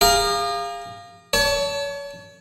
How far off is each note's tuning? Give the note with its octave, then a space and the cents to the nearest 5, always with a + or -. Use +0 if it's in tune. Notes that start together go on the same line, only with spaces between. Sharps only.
G#4 -40 F5 +0 A#5 +5
C#5 +35 A5 +5